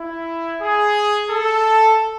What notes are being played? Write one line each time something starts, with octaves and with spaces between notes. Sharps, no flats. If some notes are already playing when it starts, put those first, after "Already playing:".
Already playing: E4
G#4
A4